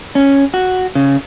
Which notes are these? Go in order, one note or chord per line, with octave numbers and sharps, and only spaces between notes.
C#4
F#4
C#3